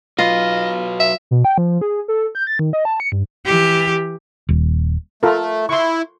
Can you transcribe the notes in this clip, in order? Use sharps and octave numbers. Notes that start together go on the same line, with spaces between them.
F#3 F4 B4 D#5
E5
B2
G5
F3
G#4
A4
G6
A6
D#3
D#5
A5
C#7
G2
E3 G4
D#1
A3 F4 A4 A#4
E4 C6 C#6